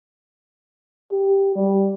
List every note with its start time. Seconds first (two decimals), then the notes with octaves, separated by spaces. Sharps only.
1.12 G4
1.55 G3